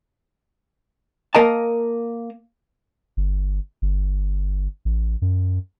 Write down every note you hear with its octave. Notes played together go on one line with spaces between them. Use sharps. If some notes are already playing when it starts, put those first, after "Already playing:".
A#3 A#4 D#5 A5
G1
G1
A1
F#2